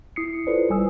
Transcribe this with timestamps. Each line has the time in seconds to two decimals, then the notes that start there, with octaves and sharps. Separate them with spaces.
0.16 E4 D#6 C7 C#7
0.47 E4 F4 A4 B4 C5 D5
0.69 G1 G3 G#5 D#6 E6